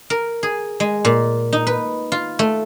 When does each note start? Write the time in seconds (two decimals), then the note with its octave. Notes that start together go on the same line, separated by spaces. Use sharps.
0.10 A#4
0.43 G#4
0.80 G#3
1.05 A#2
1.53 D#4
1.67 B4
2.12 F4
2.39 A3